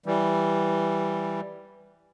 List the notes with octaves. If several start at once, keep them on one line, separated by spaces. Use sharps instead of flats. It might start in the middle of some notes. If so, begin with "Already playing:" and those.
E3 G3